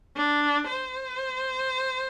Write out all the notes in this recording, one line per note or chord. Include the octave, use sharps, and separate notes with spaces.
D4
C5